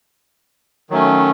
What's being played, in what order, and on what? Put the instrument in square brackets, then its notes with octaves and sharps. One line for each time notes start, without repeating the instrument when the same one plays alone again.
[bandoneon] D#3 F#3 A3 C#4